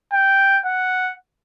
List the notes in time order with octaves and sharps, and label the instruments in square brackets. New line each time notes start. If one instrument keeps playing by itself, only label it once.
[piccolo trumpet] G5
F#5